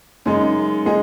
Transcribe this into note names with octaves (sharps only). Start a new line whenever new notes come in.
F#2 C#3 G#3 D#4
G#3 D#4 G#4